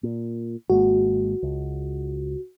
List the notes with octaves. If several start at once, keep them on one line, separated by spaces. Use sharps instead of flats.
A#2
G#1 G#3 A#3 F#4
C#2